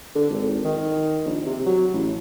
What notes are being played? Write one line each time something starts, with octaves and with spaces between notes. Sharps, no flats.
D3
G#1
D#3
D#3
A#1
C3
F#3
A1